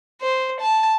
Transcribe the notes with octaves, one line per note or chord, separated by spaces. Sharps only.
C5
A5